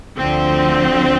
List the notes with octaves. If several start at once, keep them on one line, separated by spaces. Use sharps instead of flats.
D2 D3 F3 C4